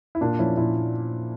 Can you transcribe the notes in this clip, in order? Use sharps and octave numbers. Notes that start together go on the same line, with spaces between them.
E4
A#2 A#3 D4
F3 C#4 E4
A#2 C#4 E4